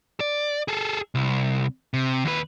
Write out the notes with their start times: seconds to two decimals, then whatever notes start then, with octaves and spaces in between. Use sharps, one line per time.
0.20 D5
0.68 G#4 A4
1.15 C2
1.94 C3
2.25 D#2 B4